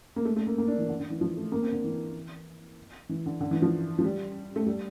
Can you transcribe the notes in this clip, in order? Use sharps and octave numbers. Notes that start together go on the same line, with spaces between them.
A#3
A3
A3
A#3
A#3
D4
E3
D3
D3
E3
F3
A3
A#3
C4
D3
E3
E3
D3
D3
E3
F3
F3
G3
A3
G3